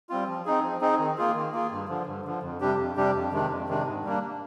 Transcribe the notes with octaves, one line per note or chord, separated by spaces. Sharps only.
G3 C4 F4
F3
C4 D#4 G#4
F3
C4 D#4 G#4
D#3
A#3 F4 G#4
D#3
A#3 F4 G#4
G2
D3 F3
G2
D3 F3
F2
C3 G3 D4 G4
F2
C3 G3 D4 G4
F2
C3 D#3 G#3 D4
F2
C3 D#3 G#3 D4
G#2
G3 A#3 D4